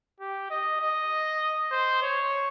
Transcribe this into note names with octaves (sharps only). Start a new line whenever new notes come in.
G4
D#5
D#5
C5
C#5